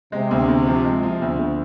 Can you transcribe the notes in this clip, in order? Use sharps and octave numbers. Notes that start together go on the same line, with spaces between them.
C3 G#3
D2
D2
F3
G#3
F3
D2
D2